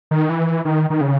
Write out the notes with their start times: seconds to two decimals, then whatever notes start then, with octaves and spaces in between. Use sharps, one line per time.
0.11 D#3
0.29 E3
0.65 D#3
0.90 D#3
1.01 C#3